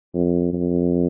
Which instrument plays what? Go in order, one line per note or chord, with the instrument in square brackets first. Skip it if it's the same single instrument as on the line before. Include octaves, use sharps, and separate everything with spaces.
[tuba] F2
F2